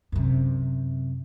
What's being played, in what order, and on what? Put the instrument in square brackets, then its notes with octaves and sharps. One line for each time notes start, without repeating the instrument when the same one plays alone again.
[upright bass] F#2 C3